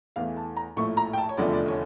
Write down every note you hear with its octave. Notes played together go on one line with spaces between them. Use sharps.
E2 E3 A3 F5
A5
A#5
A#1 A2 F3 A3 C#6
A#5
G5
A5
C#5
F1 E2 D3 F3 A3 D5
D5
C#5